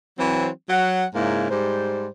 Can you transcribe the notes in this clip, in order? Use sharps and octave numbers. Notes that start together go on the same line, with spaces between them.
E3 F#3 C4
F#3 F#5
G#2 C#3 A#3 E4
G#2 G3 C5